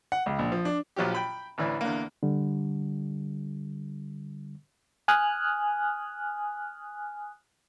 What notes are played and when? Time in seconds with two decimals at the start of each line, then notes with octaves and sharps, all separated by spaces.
0.12 F#5
0.26 C#2
0.39 A#1
0.52 F3
0.65 D4
0.96 A#1 F3 F#3 G4
1.15 G5 B5
1.58 A1 D2 E3 D4 E4
1.81 E2 D3 A#3
2.23 D3 G3
5.08 G#5 D#6 F6 F#6